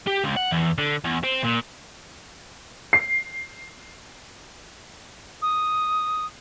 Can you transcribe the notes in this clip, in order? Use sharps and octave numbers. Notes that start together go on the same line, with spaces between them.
G4
C#2
F#5
E2
D3
E2
C4
A#2
C7
D#6